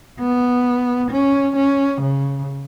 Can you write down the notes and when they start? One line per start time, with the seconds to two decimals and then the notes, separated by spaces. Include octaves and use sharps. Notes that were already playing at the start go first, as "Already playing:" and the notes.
0.19 B3
1.11 C#4
1.56 C#4
2.02 C#3